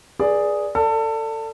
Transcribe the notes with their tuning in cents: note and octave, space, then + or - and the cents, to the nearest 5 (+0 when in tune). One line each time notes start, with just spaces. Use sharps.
G#4 +0 B4 -45 D5 +0
A4 +25 D5 +0